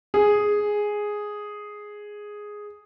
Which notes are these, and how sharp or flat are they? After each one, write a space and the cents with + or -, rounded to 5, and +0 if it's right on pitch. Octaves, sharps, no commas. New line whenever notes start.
G#4 +0